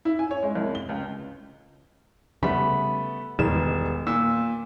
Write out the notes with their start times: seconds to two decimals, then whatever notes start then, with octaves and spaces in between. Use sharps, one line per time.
0.05 E4
0.19 G#5
0.31 C#5
0.43 G#3
0.55 C2
0.75 G7
0.89 C#2
2.43 C#3 G3 A3 B3 E5 B5
3.39 E1 A1 B2 D#3 G3 G#3 E7
4.07 A#2 E6